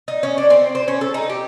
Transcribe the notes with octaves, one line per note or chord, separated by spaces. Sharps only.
D#4
C#4
D4
C4
C5
C#4
A4
D#4
G4